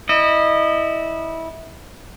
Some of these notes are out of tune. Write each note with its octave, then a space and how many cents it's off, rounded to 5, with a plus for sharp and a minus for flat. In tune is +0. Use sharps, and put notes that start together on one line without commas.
E4 -20 D#5 -30